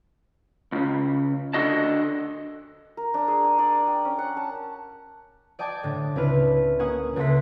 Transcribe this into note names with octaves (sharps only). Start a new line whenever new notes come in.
C#2 C#3
D3 F#4 D#5 A5
A#4
D4
G#4
G#5
D5
D6
G5
C#4
F#5
A5
D5 D#5 G5 A5 D6 G#6
A2 D3
C#2 C4 D4 E4 B4 F6
A#3 C#4 G#4 F#5 D#6
C#2 A4 E5 F#5 C6 B6